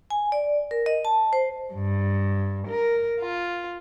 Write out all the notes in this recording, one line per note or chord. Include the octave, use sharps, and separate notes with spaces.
G#5
D5
A#4
D#5
A5
C5
G2
A#4
F4